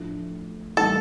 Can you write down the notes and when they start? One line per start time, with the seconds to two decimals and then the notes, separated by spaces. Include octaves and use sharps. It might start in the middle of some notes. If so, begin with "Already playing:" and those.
Already playing: A2 F3 A3 D4
0.77 A2 E3 G3 A#3 A4